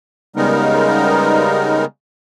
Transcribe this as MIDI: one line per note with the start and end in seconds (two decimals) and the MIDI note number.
0.36 1.85 49
0.36 1.85 55
0.36 1.85 56
0.36 1.85 59
0.36 1.85 63
0.36 1.85 70